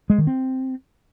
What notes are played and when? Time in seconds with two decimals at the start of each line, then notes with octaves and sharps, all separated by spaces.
0.10 G#3
0.18 D#3
0.27 C4